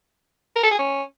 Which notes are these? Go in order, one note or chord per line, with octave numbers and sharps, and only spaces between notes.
A#4
A4
G#4
C#4